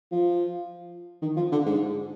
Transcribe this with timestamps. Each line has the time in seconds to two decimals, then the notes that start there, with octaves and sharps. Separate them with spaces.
0.12 F3
1.22 D#3
1.36 F3
1.52 D3
1.66 G#2